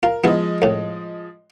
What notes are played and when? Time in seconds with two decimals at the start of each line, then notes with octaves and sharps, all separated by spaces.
0.03 F4 A#4
0.24 F3 G#3 B3 E4 D#5
0.62 C2 A2